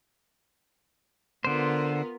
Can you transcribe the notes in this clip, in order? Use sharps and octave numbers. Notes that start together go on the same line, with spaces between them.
D3 B3 F4 A#4 C5